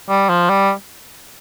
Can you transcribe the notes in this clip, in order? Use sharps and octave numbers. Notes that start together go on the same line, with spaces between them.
G3
F3
G3